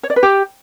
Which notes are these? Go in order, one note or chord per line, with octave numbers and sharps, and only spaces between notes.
C#5
D5
B4
G4